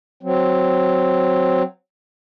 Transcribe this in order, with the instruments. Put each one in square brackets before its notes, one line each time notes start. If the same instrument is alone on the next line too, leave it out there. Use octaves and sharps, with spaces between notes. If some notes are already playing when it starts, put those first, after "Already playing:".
[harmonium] F#3 C4